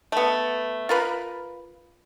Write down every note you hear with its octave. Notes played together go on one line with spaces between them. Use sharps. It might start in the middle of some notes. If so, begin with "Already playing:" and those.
A3 B3
F4 A#4 B4